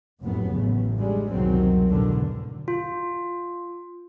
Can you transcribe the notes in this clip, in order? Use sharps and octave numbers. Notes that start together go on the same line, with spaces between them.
F1 F#2 A2 B3
A1 C#3
D3 G3 G#3
C2 F2 B2 D#3 F#3 C4
E2 G#2 B2 D3
F4